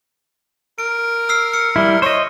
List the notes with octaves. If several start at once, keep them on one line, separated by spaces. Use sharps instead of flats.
A#4 D7
E6 F6 C7
E6 C#7
G3 E4
C5 C#5 D#5